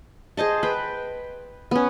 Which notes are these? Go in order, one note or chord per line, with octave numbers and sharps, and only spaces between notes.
G#4 C5 D#5 A5
B4 G5
B3 C#4